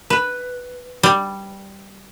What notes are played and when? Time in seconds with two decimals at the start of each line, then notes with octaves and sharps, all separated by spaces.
0.10 B4
1.03 G3